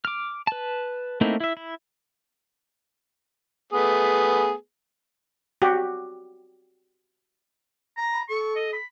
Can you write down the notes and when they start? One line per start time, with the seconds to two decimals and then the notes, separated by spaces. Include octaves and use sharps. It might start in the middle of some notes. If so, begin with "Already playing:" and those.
0.05 D6 F6
0.47 B4 A5
1.21 A3 A#3 C4 D#4 E4
1.40 E4 E5
1.57 E4
3.73 A3 B3 G#4
5.62 F#4 G4
7.97 A#5
8.13 B5
8.29 A4 C#6
8.56 D#5
8.73 B5